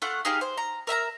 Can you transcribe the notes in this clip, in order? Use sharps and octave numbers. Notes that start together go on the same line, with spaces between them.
A3 F4 F#5
D#4 G4 G#4 F5
C5
A#5
A#4 E5 G#5 A#5